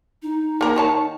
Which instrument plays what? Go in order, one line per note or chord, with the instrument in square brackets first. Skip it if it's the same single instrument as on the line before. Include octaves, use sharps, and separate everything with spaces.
[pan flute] D#4
[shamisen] A#3 A#4
D#3 C#5 A5